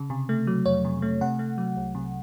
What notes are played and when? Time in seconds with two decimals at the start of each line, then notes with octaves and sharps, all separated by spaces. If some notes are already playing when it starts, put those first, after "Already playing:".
Already playing: C#3
0.10 C3
0.29 A3
0.47 F#3
0.66 F2 C#5
0.85 C3
1.02 A3
1.21 C3 F#5
1.39 A3
1.58 F#3
1.77 C2
1.95 C3